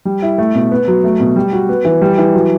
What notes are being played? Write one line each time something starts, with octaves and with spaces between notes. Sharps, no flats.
G3
E4
A3
B2
B3
F#3
A3
B2
G3
F#4
B3
E3
G3
E3
F#3